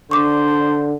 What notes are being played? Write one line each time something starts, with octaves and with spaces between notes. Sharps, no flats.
D3 D4 C5 C#6 D6